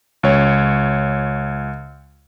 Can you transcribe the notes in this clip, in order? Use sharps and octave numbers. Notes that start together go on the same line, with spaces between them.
C#2 C#5